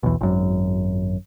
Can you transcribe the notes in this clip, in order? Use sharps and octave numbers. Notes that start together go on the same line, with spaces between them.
B1 E2
G#1 F#2